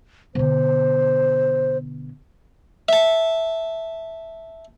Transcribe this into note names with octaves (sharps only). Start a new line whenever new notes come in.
B2 D3 C5
E5 A5